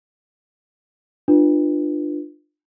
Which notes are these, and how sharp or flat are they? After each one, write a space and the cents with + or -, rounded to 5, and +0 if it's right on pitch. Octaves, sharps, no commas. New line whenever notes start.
D4 +35 F4 +0 B4 +0